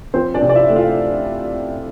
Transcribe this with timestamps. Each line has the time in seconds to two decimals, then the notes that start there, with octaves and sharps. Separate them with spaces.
0.14 F3 C4 C5
0.34 D4 D5
0.42 C3
0.49 D5
0.55 E4 E5
0.69 A3
0.76 F4 F5